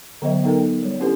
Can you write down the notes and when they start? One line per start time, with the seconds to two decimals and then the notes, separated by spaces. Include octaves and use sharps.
0.22 D3 F#3 B3 C5 D#5 E5
0.44 B3 D#4 A4 A#4 G5
0.83 G3 C#5
1.00 C4 C#4 E4 G4 A4 B4